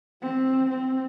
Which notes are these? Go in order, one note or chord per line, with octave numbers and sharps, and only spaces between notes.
C4
C4